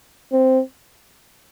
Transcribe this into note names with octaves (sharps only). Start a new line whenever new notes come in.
C4